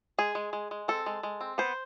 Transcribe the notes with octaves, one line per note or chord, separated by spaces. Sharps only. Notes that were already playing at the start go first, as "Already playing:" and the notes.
G#3 G#4
G#3
G#3
G#3
C4 A4
G#3
G#3
C4
B3 C5